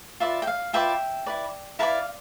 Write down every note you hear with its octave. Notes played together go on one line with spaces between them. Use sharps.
F4 B4 D5 E5
G5
F5
F4 B4 D5 E5 G5
E4 B4 D5
E4 B4 D5 F5 A5